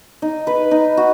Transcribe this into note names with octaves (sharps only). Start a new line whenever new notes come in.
D#4
B4
D#4
F#4